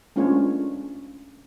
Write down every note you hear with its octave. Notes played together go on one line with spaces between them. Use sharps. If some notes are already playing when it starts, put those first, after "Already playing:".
G#3 A3 C#4 D4 F4 C#5